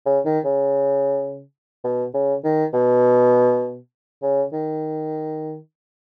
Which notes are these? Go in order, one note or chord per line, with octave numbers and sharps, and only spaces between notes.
C#3
D#3
C#3
B2
C#3
D#3
B2
C#3
D#3